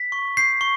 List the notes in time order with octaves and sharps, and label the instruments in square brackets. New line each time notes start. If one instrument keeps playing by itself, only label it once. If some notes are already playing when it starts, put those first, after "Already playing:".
Already playing: [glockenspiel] B6
C#6
G6 C7
C#6